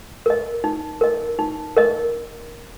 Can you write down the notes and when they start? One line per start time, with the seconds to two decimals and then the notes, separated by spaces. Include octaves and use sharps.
0.26 A#4 D#5
0.64 D#4
1.01 A#4 D#5
1.39 D#4
1.77 A#4 D#5